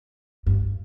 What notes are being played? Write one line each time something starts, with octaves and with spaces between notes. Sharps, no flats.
G2